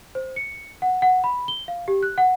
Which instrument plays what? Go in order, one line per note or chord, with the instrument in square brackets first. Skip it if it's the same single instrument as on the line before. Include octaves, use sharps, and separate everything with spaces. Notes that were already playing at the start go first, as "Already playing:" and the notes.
[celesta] C5
C#7
F#5
F#5
B5
G7
F5
G4
F#6
F#5